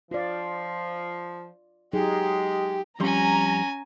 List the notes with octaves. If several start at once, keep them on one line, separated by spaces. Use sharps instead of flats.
F3 F4 D5
F#3 G#3 D#4 G4 G#4
F2 G3 C#4 G#5 A#5 C6